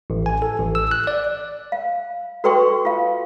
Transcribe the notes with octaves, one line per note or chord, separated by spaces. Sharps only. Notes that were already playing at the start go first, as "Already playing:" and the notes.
A1
G#5
A4
A1
E6
F#6
D5
F5
F#4 A4 B4 G5 C6 C#6
F4 F5